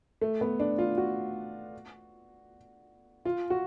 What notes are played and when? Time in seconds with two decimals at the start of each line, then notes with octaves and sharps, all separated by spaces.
0.21 A3
0.41 B3
0.60 D4
0.78 F4
0.98 F#4
3.25 F4
3.50 F#4